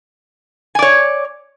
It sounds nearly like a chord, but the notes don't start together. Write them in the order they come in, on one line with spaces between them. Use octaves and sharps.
G#5 D5 C#5